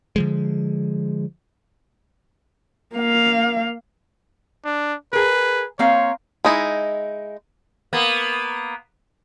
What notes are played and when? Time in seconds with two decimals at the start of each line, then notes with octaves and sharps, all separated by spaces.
0.16 D3 F3 G#3
2.94 A#3 F5
4.65 D4
5.13 G#4 A#4 B4
5.79 A#3 C4 C#5 F5
6.45 G#3 D#4 E4
7.93 A#3 B3